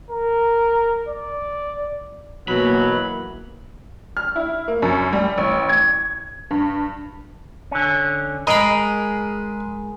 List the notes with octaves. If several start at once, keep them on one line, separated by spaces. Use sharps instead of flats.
A#4
D5
B2 E3 F#3 A#3 B5
F6
E4
A#3
F#2
G3
A1
G#6
G2
D3 C#4
G#3 G#4 A#4 D#5 B5